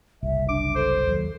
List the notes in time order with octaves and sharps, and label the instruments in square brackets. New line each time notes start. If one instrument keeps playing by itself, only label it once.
[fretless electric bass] F#1 C2 [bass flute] E5
[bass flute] D4 [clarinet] D6
[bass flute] A4 [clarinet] C5
[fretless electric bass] D#2 F#3